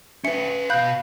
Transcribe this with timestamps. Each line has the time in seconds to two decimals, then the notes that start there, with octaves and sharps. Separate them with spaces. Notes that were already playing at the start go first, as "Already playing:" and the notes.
0.24 C#4 B4 E5 C#7
0.70 B2 F5 B5 F#6 G6